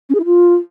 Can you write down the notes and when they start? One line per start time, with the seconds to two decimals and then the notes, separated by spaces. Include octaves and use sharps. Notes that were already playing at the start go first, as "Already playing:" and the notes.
0.09 C#4
0.15 G#4
0.20 E4
0.25 F4